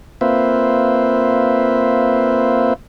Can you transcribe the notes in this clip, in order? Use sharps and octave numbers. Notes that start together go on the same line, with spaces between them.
A#3 C4 F4 B4 C5 E5